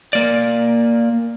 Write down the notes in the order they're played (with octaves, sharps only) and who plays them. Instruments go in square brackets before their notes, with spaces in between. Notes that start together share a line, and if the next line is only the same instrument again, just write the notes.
[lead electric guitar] A#3 D5